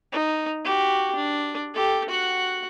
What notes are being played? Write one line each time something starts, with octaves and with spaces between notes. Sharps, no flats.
D#4
F#4 G4
D4
G4 A4
F#4 F#5